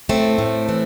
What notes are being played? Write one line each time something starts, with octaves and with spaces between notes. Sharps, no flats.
A2 A3 C4
A2
E3